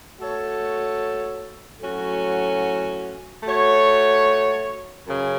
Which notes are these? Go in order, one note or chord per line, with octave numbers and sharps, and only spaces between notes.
A3 F#4 A4 C#5
A2 F#3 C#4 F#4
A3 F#4 C#5
F#2 C#3